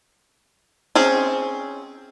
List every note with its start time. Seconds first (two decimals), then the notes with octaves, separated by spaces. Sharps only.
0.95 C4 C#4 G#4